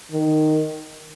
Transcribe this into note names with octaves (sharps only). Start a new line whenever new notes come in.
D#3